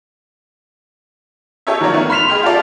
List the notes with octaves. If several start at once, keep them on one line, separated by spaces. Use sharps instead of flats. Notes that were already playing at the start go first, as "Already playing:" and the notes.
G4 A4 C#5 D#5 E5
D#3 F#3 A#3 C#5 D5
D#3 A3 B3
B5 C6 F6 B6 E7 F7
G#4 D#5 G5 C6
F4 G4 A4 D5